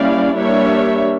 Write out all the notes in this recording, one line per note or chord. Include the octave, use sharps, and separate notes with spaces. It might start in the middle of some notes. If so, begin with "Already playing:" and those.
Already playing: G3 A#3 C#4 E4 D5 F5
G3 A#3 D4 C#5 E5